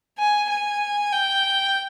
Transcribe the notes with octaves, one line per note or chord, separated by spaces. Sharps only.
G#5
G#5
G5